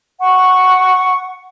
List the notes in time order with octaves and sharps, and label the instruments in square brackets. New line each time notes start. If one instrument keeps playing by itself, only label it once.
[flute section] F#5 C#6